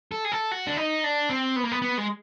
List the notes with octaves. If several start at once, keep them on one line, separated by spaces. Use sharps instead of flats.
A4
G#4
A4
F#4
D4
D#4
D4
C4
B3
A#3
B3
B3
G#3